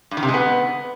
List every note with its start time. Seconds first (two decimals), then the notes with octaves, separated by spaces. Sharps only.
0.11 G2
0.17 D#3
0.23 C3
0.28 G#3
0.34 B3